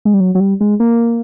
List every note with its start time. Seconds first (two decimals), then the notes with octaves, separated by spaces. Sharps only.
0.05 G#3
0.14 G3
0.20 F#3
0.35 F#3
0.40 G3
0.61 G#3
0.80 A#3